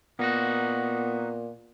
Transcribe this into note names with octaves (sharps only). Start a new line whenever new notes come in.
A#2 A#3 B3 D#4 F#4